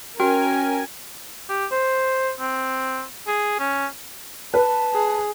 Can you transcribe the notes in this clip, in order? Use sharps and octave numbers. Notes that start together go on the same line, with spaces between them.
C#4 F#4 A#4 G5 G#5 F6
G4
C5
C4
G#4
C#4
B4 A5
G#4